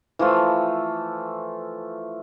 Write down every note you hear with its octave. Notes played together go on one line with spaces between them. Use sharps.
E3 F3 A3 F4